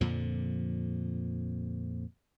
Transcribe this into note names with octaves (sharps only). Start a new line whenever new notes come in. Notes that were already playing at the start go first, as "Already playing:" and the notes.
F2 A#2 D3 F3